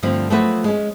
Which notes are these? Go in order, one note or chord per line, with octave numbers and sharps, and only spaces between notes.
G2 D3 F3 A3 C4
F3 F#3 A3 B3 F#4 B4
G#3 C#4